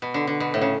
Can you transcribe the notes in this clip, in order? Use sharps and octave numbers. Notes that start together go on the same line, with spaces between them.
B2
D3
D3
B2
A2
C#3